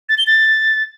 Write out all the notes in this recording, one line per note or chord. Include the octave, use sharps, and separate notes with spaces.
A6
G7
A6